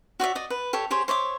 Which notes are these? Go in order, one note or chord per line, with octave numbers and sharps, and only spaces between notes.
F#4 C#5 D5 E5
D5 D#5
B4
G4 A4 C#5
G4 G#4 C5 C#5
C5 C#5 E5 D6